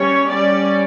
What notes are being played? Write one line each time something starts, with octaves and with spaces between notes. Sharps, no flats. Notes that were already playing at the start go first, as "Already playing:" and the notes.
Already playing: G3 C#4 C#5
G3 C#4 D5